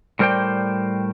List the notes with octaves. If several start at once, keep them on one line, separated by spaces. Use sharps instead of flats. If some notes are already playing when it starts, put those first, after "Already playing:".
A2 G3 A#4 C5 D5 G5